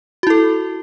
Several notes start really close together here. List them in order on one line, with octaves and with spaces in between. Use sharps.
F#4 E4 A4